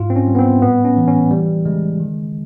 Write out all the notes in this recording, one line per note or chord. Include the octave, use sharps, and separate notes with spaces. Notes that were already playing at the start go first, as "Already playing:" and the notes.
Already playing: G#2 F4
C4
C#4
G3
B3
C4
A2 B3
C#4
E3
C#4
E3 G3
C#3 G#3
D#3